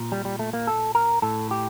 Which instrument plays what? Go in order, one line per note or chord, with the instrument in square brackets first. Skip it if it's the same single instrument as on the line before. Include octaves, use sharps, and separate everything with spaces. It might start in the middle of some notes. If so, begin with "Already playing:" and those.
Already playing: [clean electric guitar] A#2
G3
G3
A3
A#3
A4
A#4
A2 A4
G4